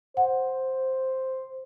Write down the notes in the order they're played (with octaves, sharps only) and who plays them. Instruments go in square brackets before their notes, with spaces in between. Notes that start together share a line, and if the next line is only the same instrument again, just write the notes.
[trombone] C5 [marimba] F#5